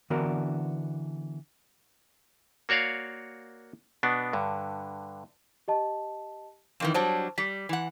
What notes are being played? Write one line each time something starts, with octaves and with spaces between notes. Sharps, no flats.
D3 E3 B3 D4 F#4 A#4
A#3 F#4 C#5 D5 F5
B2 B3 D4
G2 D3
G4 D#5 A5
F2 D#3 E3
F#3 G3 D4 C5 A5
G3 B6
E3 F#5